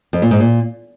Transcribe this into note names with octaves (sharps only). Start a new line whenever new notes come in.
F2
A#2
G#2
A#2